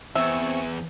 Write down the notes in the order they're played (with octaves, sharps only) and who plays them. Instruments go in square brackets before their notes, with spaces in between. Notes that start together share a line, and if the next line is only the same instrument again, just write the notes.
[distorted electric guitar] E2 [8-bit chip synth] C4 C#6 [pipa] E5